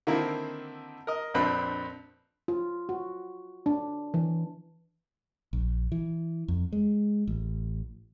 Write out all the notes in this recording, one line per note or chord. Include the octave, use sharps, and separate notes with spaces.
D3 D#3 A#3 C4 E4
A#4 D#5
A#1 F2 C4 D4 B4
F4
F#4
D4
E3
A#1
E3
F2
G#3
A1